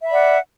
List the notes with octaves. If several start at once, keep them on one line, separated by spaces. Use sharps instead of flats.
D5 E5 F#5 B5